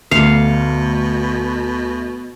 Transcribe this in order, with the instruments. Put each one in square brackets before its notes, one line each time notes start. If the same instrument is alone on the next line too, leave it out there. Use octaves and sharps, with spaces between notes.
[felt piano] D2 [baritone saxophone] B2 [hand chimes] A3 C#7 [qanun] F5